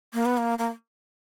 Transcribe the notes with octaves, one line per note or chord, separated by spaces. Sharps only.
A#3
B3
A#3
A#3